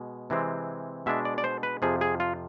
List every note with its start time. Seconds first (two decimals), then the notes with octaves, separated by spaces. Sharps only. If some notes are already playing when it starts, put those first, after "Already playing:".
Already playing: B2 G#3
0.30 C3 E3 G#3 C4
1.06 B2 G#3 D4 E5
1.25 D5
1.38 D5
1.44 C5
1.63 B4
1.82 F2 C3 F3 G#4
2.01 G#4
2.20 F4